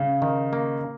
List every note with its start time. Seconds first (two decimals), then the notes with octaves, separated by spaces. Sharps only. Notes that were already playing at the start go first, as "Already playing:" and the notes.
Already playing: C#3
0.22 D#3
0.53 A#3